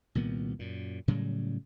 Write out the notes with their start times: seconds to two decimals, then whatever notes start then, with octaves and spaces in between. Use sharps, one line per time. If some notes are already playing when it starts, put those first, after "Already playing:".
0.15 C2 A#2 D#3 B3
0.59 F#2 A#2
1.08 A2 C#3 F#3 G3